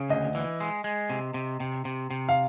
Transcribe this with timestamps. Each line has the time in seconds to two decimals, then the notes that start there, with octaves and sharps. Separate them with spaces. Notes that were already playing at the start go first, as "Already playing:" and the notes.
Already playing: C#3
0.10 D2 D#5
0.35 E3
0.60 G#3
0.84 G#3
1.10 C3
1.34 C3
1.60 C3
1.85 C3
2.11 C3
2.29 F5